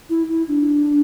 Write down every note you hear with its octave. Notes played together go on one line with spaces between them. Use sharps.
E4
E4
D4